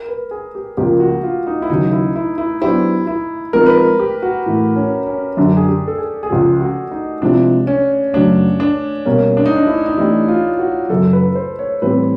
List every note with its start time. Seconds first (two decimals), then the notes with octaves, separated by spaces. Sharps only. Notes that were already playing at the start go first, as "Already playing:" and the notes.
Already playing: A#4
0.09 B4
0.31 G#4
0.55 G4
0.77 C#2 C#3 F3 A#3 G4
1.00 F#4
1.23 F4
1.47 D#4
1.62 E4
1.70 D#2 C#3 F#3 D#4
1.92 E4
2.16 E4
2.38 E4
2.62 F#3 B3 D4 E4 G4 C5
3.07 E4
3.53 F3 G#3 C4 D#4 A#4
3.66 B4
3.77 A#4
4.00 G4
4.22 F#4
4.46 A2 E3 A3
4.76 C#4
5.06 C#4
5.37 F#2 D3 F#3 D4
5.57 G#4
5.68 G4
5.88 A4
5.98 G#4
6.23 G#4
6.30 C#2 C#3 F3 G4
6.61 F#4
6.91 D#4
7.22 C3 F3 G#3 C4 D4 E4
7.67 C#4
8.13 F#2 C#3 F#3 A3 C#4 D4
8.60 D4
9.06 B2 G3 A#3 C#4
9.37 D4
9.46 D#4
9.56 D4
9.67 E4
9.86 D#4
9.98 E3 A3 D4 E4 G4
10.28 F4
10.59 F#4
10.90 F#2 C#3 F#3 A4
11.13 B4
11.35 C5
11.59 C#5
11.82 A2 E3 G3 C4 B4